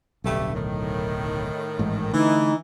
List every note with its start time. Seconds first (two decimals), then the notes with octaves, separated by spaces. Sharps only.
0.24 D1 B1 G2 A3
0.55 A2 D#3
1.79 A1 G#2
2.14 D3 E3 A3 D#4